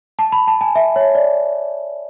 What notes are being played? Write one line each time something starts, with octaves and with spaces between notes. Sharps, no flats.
A5
B5
A5
G#5
E5
C#5
D5